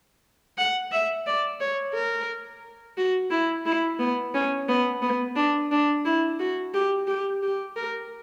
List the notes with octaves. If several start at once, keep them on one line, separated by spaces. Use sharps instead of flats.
F#5
E5
D5
C#5
A#4
F#4
E4
E4
B3
C#4
B3
B3
D4
D4
E4
F#4
G4
G4
G4
A#4